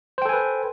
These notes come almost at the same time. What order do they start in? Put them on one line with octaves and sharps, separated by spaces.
C5 G5 A4 G#5 B4